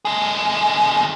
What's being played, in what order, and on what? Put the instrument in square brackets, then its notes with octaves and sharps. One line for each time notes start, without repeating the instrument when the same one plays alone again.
[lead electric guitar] D3 G#4